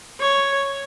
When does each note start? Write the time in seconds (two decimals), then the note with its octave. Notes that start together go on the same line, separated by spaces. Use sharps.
0.21 C#5